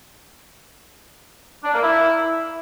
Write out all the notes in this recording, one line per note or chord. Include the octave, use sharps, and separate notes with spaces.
D4
A#3
E4